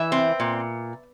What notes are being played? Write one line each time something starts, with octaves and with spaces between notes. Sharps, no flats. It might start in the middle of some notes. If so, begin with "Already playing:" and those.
Already playing: E3 E5
C4
A#2